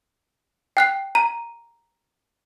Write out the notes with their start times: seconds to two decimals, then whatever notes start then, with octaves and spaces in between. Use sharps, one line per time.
0.77 G5 F#6 C7
1.15 A#5 D#7